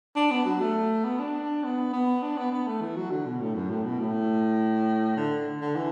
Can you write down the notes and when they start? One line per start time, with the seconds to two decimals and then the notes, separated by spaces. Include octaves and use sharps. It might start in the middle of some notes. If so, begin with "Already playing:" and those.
0.16 D4
0.31 B3
0.45 F#3
0.61 A3
1.04 B3
1.19 D4
1.64 B3
1.93 B3
2.22 D4
2.37 B3
2.52 B3
2.67 A3
2.81 E3
2.96 F#3
3.11 D3
3.26 B2
3.40 A2
3.55 F#2
3.70 A2
3.85 B2
4.00 A2
5.17 D3
5.61 D3
5.76 E3